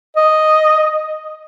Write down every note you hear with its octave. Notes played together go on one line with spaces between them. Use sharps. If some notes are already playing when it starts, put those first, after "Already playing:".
D#5